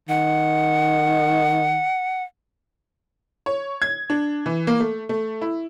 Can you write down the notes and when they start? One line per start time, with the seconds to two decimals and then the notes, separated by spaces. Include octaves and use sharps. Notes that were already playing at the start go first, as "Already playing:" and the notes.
0.09 D#3 F#5
3.46 C#5
3.82 G#6
4.10 D4
4.46 E3
4.67 A#3
4.80 A3
5.09 A3
5.41 E4